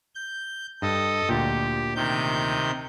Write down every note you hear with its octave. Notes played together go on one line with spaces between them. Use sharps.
G6
G2 A4 D#5
D2 A#2 G4
C3 D#3 G6